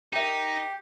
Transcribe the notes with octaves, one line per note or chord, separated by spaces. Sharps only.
D#4 G4 A#4 E5